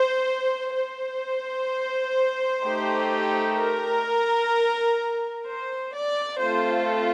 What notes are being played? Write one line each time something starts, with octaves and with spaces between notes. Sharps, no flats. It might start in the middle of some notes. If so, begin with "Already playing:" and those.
Already playing: C5
C5
A3 D#4 G4
A#4
C5
D5
A3 C4 F4 A4 C5